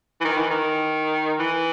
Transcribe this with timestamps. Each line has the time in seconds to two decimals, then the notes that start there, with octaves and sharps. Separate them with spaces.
0.21 E3
0.25 D#3
0.38 E3
0.50 D#3
1.39 E3